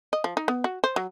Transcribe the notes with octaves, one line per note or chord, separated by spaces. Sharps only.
D#5
F3
D#4
B3
F#4
C5
F#3